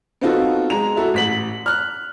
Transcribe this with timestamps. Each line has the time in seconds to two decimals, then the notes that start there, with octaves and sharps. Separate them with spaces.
0.21 B3 C4 D#4 F4 F#4 A4
0.70 G#3 A#5 F7
0.96 E4 F#4 A4
1.14 A1 B6 F#7
1.66 F6 F#6